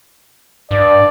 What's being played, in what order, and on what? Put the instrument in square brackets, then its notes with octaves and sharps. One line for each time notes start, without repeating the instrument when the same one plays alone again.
[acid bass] G2 [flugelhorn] D5